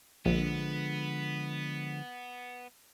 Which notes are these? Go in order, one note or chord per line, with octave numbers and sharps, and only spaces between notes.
A#1 D3 F3 G#3 B3